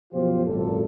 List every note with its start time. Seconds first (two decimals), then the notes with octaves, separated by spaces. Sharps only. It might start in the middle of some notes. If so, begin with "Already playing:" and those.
0.13 F#2 B2 F3 F4 G4 C5
0.46 G#1 F#2 A#2 A4